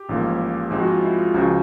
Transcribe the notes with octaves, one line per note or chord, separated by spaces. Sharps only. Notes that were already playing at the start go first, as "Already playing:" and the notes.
Already playing: G4
A1 G#2 F3 A#3
G#2 F3 G#3 C4
F#4
F4
E4
F4
C#2 C#3 F3 F#4